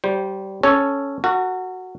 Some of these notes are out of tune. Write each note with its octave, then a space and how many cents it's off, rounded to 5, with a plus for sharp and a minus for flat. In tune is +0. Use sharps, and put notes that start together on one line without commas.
G3 -20 C5 +0
C#4 +0 A4 +0 C#5 +0
F#4 +0 A#4 -45